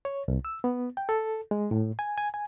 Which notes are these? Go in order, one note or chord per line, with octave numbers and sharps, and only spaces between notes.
C#5
C2
E6
B3
G5
A4
G#3
A2
G#5
G#5
G#5